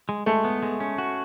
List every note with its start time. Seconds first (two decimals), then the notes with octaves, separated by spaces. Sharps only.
0.09 G#3
0.26 G#3 A3
0.44 B3
0.63 G#3
0.80 C#4
0.98 F#4